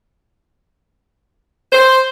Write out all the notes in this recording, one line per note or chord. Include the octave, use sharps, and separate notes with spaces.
C5